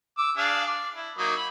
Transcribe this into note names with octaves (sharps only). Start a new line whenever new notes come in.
D6 E6
D4 G#4 F5
D5
E4
F#3 A#3 D#4
B5